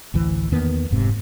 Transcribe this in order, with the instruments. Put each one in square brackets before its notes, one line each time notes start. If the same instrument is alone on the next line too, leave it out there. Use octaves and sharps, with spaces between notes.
[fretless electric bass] A1 D2 E3
E2 D#3 A#3 B3
F1 G#2 C3